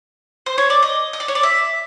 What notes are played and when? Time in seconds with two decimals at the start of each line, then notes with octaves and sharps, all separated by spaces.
0.46 C5
0.58 C#5
0.70 D5
0.82 D#5
1.13 D#5
1.20 D5
1.28 C#5
1.35 D5
1.43 E5